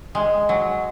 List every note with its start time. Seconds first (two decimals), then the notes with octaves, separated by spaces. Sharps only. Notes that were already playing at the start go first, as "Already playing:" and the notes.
0.15 G#3
0.49 F#3